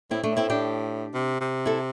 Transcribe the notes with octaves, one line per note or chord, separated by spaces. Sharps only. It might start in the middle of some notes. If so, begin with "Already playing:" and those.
A2 C4 E4
A3 D4
A2
C4 E4
D4 G4
C3
C3
E4 A4